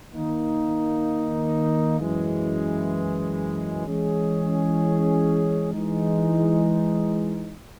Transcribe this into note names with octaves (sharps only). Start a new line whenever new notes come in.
D#3 A#3 D#4
F#2 E3 G#3
E3 G#3 C#4 G#4
E3 G#3 D#4